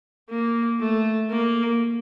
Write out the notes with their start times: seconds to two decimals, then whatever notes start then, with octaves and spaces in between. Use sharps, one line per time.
0.30 A#3
0.80 A3
1.30 A#3